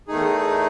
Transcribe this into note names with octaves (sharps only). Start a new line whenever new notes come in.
E2 D#3 A3 D#4 G#4